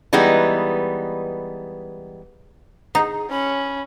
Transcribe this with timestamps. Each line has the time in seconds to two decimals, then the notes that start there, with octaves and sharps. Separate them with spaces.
0.13 E3 G3 G#3 B3 D#4
2.95 D#4 E4 G#4 F#5 A#5
3.30 C#4 B5